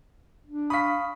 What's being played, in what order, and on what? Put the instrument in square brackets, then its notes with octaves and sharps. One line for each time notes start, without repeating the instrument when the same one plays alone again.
[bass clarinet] D4
[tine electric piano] F5 C#6 D#6 [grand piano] B5 B6